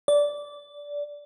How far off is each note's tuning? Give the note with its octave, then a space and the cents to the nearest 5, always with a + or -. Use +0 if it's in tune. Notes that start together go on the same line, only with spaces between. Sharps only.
D5 -15